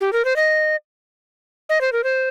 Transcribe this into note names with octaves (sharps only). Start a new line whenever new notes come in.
G4
A#4
C5
D#5
D#5
C5
A#4
C5